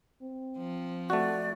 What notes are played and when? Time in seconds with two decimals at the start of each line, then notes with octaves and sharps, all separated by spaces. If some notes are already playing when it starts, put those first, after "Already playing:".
0.22 C4
0.58 F3
1.10 A3 F#4 D5